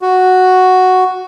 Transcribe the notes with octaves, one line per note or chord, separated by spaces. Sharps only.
F#4